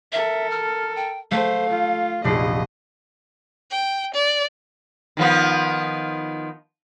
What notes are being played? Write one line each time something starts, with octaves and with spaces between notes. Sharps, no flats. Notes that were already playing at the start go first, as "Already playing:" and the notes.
A4 A#4 E5
F6
G5
A3 C5 F5
F4
F1 A#1 D#5 C7
G5
D5
D#3 F3 B3